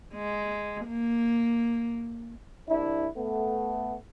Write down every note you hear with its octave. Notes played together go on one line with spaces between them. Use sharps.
G#3
A#3
C2 D4 E4
A3 B3